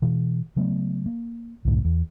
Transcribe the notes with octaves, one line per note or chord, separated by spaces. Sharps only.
B2 E3
C#3 F#3 A3 B3
A#3
C2 F#2 A2 D3
E2